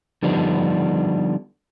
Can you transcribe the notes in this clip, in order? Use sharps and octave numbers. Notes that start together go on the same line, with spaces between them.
D3 F3 G3 B3 D4 D#4